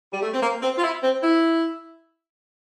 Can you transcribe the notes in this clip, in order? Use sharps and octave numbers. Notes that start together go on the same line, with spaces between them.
G3
A3
C4
A#3
C4
F4
E4
C4
E4